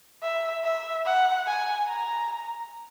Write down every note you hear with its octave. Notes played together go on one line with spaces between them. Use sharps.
E5
E5
F#5
G#5
A#5